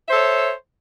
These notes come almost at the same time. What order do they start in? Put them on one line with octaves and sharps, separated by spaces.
E5 C5 A4 C#5